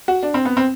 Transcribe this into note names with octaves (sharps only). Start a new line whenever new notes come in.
F#4
D4
C4
B3
C4